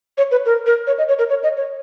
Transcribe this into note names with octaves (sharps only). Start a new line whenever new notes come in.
C#5
B4
A#4
A#4
C#5
D#5
C#5
A#4
C#5
D#5
C#5